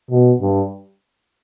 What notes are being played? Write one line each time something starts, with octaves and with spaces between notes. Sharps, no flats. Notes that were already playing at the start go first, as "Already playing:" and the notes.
B2
G2